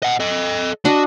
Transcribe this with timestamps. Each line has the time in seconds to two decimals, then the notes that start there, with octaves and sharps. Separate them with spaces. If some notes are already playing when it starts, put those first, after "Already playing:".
0.03 D#5 F#5
0.20 A4 D#5
0.85 D4 F#4 D#5